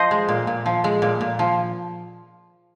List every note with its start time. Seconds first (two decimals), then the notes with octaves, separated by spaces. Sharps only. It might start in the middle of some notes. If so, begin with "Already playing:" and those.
Already playing: F3 C5 D#5
0.11 G#3
0.29 A#2
0.47 A#2
0.66 F3
0.84 G#3
1.02 A#2
1.21 A#2
1.39 F3